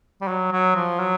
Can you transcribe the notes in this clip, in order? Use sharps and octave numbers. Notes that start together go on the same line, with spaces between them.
G3
F#3
F#3
F3
F#3